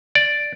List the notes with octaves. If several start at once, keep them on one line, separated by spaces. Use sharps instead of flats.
D5